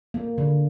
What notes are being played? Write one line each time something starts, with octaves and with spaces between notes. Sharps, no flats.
A#3
D3